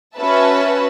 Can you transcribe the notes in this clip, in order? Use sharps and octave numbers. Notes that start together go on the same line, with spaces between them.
C#4 F#4 B4 E5 A5